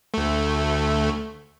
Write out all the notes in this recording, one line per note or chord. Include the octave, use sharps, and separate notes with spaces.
D2 A3